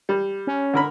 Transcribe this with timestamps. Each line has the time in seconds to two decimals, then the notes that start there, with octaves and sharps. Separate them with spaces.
0.09 G3
0.47 C#4
0.73 D3 A#4 B5